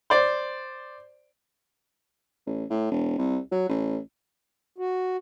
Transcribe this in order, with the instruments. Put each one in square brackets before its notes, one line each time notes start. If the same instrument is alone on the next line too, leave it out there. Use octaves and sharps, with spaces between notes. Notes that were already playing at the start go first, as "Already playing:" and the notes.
[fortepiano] C5 D5
[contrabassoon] A1
A2
E1
C2
F#3
A1
[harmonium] F#4